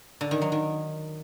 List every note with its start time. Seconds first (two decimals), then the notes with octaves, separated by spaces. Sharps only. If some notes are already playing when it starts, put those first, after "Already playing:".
0.21 D3
0.31 D#3
0.42 F#3
0.52 D#3